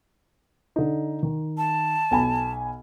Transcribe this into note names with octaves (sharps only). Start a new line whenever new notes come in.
D3 D#4
D#3
A5
B1 G#5 B5